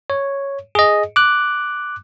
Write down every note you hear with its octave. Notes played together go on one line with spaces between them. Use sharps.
C#5
G#4 D#5
D6 F#6